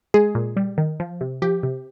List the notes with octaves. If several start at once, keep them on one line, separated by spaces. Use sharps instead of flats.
G#3 G#4
A#2
G3
D#3
F3
C3
F3 G4
C3